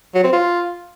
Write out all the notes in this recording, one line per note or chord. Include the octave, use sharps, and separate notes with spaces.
F#3
C4
F4